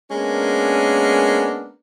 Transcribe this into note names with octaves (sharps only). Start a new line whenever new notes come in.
G#3 A#3 B3 C#4 D4 A#4